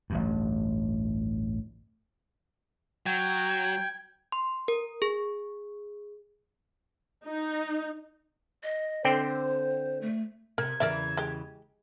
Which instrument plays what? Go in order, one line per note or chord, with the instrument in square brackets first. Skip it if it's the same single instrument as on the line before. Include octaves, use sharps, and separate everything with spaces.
[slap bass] A1 D2 G2
[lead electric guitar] F#3 [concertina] G5 [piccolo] G#6
[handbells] C6
A#4
G#4
[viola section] D#4
[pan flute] D#5
[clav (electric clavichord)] D3 C4 G5 [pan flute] C5
[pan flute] A3
[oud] C3 [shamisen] A#4 [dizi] G#6
[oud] E2 C#3 E3 [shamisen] A#4 D5 E5
[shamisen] G#3 G4